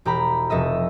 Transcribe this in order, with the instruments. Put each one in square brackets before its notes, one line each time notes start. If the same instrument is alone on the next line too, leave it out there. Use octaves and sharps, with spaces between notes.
[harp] E1 G4 A#5 B5
F1 A4 D#5 E5